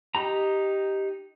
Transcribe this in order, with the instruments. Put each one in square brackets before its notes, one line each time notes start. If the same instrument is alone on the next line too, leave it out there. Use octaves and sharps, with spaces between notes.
[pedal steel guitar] D#4 G4 A#5